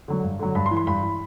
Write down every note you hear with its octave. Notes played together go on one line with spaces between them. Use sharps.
D3 F#3
G2
D3 F#3
G2 B5
C6
E3
C6
G2 B5
E3